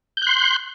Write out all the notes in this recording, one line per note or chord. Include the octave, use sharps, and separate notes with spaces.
C6 F#6 G6